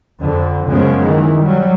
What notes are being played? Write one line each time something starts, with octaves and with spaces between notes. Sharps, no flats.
F2 D3
F#2 C#3 F3 G#3 B3
D#3 E3
F#3 G3